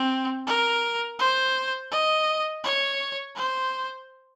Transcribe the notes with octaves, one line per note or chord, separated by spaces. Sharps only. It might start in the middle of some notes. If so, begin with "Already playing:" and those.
Already playing: C4
A#4
C5
D#5
C#5
C5